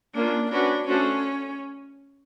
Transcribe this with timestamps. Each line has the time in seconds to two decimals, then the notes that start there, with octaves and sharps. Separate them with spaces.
0.15 A#3 C#4 D4 F4
0.51 C#4 D4 F#4 B4
0.88 A3 C#4 D4 F#4 A4 C5